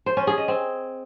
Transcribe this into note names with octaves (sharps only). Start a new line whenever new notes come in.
C5
C#4
G#4
D#5
C4